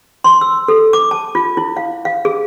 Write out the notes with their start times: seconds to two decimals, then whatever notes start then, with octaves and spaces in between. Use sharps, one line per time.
0.24 C6
0.41 E6
0.68 A4
0.93 D6
1.11 A5
1.35 F4
1.57 E4
1.77 F5
2.05 F5
2.25 G#4